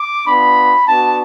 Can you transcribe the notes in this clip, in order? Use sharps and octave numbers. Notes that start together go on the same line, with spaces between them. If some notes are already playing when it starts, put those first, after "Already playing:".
Already playing: D6
B3 D4 F4 B5
B3 D4 F#4 A5